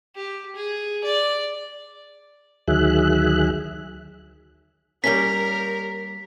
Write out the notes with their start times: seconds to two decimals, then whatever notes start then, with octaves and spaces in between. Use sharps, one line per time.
0.15 G4
0.56 G#4
1.04 D5
2.68 D2 D#3 F#3 G#4 E5 F#6
5.04 G3 A#3 C#4 A#4 B6